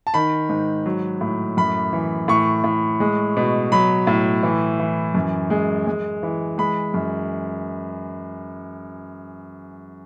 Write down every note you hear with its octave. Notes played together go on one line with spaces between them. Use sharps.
A5
D#3 B5
G#2
F#3
A2
F#2 B5
E3
A2 C#6
A2
G#3
B2
F#3 B5
A2
E3
E3
F#2
G#3
G#3
E3
G#3 B5
F#2